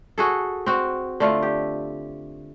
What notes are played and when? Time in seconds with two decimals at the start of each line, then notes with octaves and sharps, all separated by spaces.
0.18 F#4 G#4 A4
0.66 C4 F#4
1.20 D3 A3 F4
1.43 G4